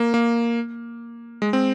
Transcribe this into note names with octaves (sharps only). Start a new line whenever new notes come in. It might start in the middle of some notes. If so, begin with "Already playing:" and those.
Already playing: A#3
A#3
G#3
C4